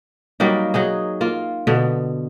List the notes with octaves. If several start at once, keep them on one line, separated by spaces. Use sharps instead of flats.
F#3 G3 A#3 D#4
F#3 D#4 G#4
A#3 F4
B2 D3 B3